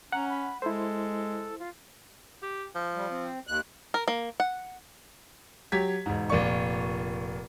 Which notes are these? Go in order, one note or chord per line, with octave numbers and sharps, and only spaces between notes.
C#4 F#5 A#5
B5
G#3 E4 A4 C5
F4
G4
F3
G3
C4
D#2 F#6
A#4
A#3
F#5
F#3 G4 G#6 B6
E1 G#2
F1 A#2 D5 C#6